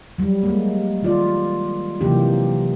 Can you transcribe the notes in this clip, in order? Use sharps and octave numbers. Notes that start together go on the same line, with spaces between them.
F#3 G3
G#3 A#3
D#3 F4 D5
C3 E3 F#3 A#3 D#4 G4